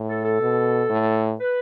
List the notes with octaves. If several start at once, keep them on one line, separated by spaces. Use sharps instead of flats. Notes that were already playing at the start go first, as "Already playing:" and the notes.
Already playing: A2
A4
A4
B2
A2
B4